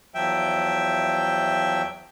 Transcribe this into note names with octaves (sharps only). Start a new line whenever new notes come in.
E2 F3 F#3 E5 G5